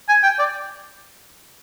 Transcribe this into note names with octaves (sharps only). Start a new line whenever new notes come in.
G#5
G5
D5